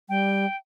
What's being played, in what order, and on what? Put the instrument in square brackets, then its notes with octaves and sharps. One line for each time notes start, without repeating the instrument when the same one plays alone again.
[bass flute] G3 [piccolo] G5